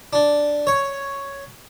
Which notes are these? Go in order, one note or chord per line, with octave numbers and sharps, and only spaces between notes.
D4
C#5